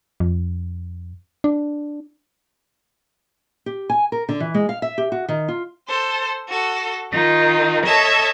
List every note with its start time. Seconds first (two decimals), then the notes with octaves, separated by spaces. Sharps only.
0.20 F2
1.44 D4
3.66 G4
3.90 G#5
4.12 A#4
4.29 D3
4.40 E3
4.54 G#3
4.69 F5
4.82 E5
4.98 G4
5.12 F#4
5.28 D#3
5.48 F4
5.88 A4 C5
6.48 F#4 A4
7.11 D#3 D#4 F4
7.85 A4 C#5 D#5 E5 A5